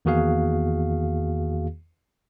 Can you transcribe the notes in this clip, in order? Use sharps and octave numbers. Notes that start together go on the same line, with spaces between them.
E2 D#3 A#3 F#4 G#4 F5